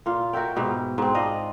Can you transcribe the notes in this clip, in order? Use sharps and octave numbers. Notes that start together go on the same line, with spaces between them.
A#2 F4
F#4 A#4 E5 G5
G#2 B2 G4
G#2 C4
D4 F4 D#5 F5